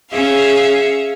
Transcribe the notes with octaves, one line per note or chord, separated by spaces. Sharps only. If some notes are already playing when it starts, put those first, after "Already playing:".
C#4 G#4 E5 F5